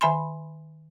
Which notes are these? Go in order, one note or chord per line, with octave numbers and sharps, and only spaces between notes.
D#3 E5 G#5 B5 C6